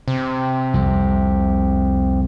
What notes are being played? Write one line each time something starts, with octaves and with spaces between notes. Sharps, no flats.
C3
C2 F2